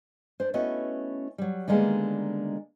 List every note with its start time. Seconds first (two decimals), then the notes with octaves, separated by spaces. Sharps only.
0.40 D4 C5
0.54 A3 B3 C#4 E4 F#4 D#5
1.38 F#3 G3
1.68 D3 D#3 G3 G#3 A#3 B3